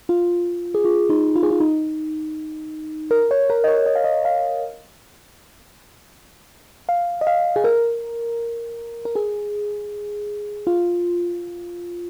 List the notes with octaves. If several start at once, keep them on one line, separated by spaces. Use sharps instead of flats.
F4
G#4
F4
D#4
F4
G#4
F4
D#4
A#4
C#5
A#4
D#5
C#5
D#5
F5
D#5
F5
F5
D#5
F5
G#4
A#4
A#4
G#4
F4